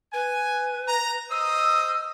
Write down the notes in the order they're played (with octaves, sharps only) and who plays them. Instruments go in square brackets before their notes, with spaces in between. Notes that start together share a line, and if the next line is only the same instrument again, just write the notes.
[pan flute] B4 [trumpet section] G#5
[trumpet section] A#5
[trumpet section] C5 D#5 D#6 [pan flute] E6